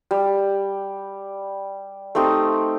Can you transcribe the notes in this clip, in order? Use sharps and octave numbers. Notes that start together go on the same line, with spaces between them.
G3
A3 C4 D#4 G4